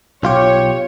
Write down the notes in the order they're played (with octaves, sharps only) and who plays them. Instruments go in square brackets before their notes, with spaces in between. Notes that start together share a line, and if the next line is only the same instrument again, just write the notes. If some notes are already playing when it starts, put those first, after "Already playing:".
[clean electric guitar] B1 F4 G4 [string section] C#5